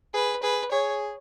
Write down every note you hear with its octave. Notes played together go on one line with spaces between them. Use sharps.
G#4 B4
G#4 B4
G#4 C#5